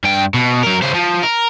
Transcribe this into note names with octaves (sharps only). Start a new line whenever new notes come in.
G2 G5
B2
F#3 A#4
C#3 C5
F3
A#4